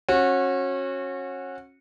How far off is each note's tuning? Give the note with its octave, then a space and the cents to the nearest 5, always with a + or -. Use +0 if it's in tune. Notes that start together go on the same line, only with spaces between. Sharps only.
C#4 -30 F#4 -20